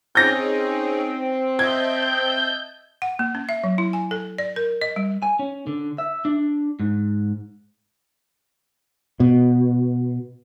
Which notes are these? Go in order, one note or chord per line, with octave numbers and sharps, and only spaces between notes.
C4 C#4 D#4 G#4 G6 A#6
D#5 E5 A5 G6 G#6
F#5
A#3
C#4
E5
F#3
E4
G#5
A4
D5
A#4
D#5
G3
G#5
C#4
D3
E5
D4
G#2
B2